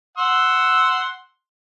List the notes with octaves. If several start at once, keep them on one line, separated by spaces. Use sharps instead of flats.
F#5 C6 E6